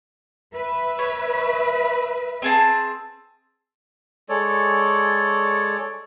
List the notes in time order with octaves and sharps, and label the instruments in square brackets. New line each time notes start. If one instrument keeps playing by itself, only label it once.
[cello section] B4 E5
[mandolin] C#5
C4 G#4 A5
[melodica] G#3 A4 C#5 D5